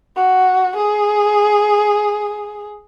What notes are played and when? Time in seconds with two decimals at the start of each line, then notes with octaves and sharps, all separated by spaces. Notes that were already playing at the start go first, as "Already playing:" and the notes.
0.16 F#4
0.77 G#4